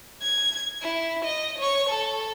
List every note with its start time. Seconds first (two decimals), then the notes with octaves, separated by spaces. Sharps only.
0.22 G#6
0.82 E4
1.25 D#5
1.59 C#5 C#6
1.89 A4